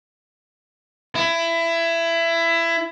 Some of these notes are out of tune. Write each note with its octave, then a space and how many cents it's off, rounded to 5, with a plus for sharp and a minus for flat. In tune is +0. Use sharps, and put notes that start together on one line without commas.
E4 +20